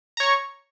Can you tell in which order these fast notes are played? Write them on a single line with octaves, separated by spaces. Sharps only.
A#5 C#5 C#6